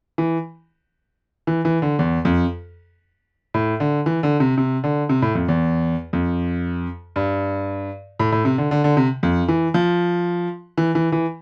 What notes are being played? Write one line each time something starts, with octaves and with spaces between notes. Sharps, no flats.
E3
E3
E3
D3
E2
F2
A2
D3
E3
D3
C3
C3
D3
C3
A2
F2
E2
F2
G2
A2
A2
C3
D3
D3
D3
C3
F2
E3
F3
E3
E3
E3